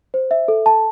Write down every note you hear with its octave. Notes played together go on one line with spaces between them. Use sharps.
C5
E5
A4
A5